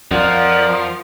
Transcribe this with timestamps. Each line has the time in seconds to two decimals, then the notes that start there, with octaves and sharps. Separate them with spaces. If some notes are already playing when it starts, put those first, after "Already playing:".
0.11 F2 F3 A#4 D5 F#5